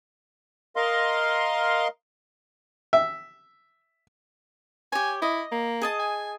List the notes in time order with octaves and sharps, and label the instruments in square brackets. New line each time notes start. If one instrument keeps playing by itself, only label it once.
[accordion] A#4 D#5 F5 C6
[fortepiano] E5
[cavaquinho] G4 C#5 [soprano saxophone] G#5
[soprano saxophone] E4 [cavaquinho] D#5
[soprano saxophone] A#3
[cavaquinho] G#4 D#5 A5
[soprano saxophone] G#5